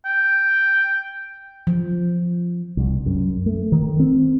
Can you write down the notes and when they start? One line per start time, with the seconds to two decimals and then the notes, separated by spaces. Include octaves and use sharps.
0.05 G5
1.67 F3
2.77 C2
3.06 F#2
3.46 A3
3.72 D#3
4.00 C4